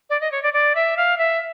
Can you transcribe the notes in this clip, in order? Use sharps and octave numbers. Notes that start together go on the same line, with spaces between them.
D5
D#5
C#5
D5
D5
E5
F5
E5